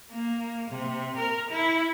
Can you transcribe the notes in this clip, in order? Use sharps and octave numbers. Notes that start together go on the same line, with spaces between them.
A#3
C3
A#4
E4